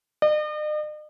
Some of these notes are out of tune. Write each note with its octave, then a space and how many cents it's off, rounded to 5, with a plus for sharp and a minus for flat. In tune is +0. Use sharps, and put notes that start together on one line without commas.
D#5 -45